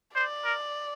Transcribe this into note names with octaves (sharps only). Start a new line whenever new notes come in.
C5 D5
A#4